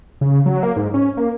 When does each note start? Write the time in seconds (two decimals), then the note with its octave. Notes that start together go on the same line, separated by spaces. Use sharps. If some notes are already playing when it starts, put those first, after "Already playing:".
0.21 C#3
0.46 F#3
0.63 A#3
0.76 G#2
0.94 C#4
1.17 A#3